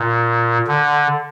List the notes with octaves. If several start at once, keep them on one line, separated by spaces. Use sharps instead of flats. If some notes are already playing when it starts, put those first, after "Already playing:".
Already playing: A#2
D3